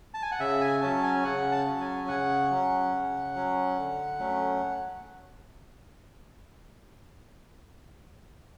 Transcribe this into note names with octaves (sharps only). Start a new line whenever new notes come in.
A5
G#5
F#5
C#3 E5
G#5
F#3 C#4 A5
G#5
C#3 F#5
A5
F#3 C#4
G#5
C#3 F#5
F#3 C#4
C#3
F#3 C#4
D3
F#3 A3 C#4